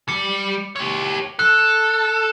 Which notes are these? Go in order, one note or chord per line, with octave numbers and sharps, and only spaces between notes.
G3 C#7
G4 C#5
A4 F#6